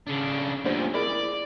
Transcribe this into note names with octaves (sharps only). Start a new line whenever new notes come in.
C#3 D4
D2 A#2 D4 G4 C5
E4 G#4 A#4 D5